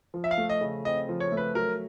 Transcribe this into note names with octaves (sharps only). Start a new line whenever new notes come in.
F3
E5
F5
A3
D#5
C#3
C4 D#5
F3
C#5
A3
B4
F#3 A#4